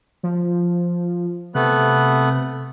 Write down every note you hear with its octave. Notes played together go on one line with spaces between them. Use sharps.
F3
C3 A3 B3 F#6